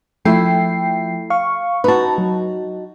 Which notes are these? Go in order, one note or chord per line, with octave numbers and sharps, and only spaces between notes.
F3 A3 E4 G5 C7
F5 C#6
D#4 F#4 B4 A5
F#3